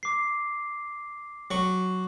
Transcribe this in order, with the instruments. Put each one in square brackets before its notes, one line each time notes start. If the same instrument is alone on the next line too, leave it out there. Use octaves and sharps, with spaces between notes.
[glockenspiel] D6 C7
[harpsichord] F#3 C#6